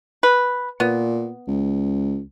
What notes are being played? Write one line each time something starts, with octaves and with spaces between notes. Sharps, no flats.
B4
A#2 B3
C#2